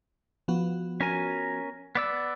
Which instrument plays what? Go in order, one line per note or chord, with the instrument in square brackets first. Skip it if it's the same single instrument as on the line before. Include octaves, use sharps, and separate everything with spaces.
[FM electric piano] F3 B3 F#4
[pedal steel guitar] C#4 A#4 G#5
B3 D5 E6